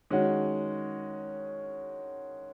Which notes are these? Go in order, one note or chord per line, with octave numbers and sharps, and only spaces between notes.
D#3 G#3 C#4 F#4